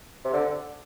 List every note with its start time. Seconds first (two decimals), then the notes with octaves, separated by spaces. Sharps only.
0.25 C3
0.33 D3